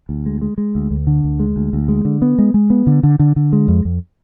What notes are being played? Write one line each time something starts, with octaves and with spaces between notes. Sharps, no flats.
D2
G#3
G#3
G#3
D2
D2
D3
D2
G#3
D2
D2
G#3
D3
B3
G#3
G#3
B3
D3
D3
D3
D3
G#3
F2
F2